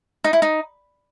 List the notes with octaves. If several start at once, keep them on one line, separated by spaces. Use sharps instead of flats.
D#4
E4
D#4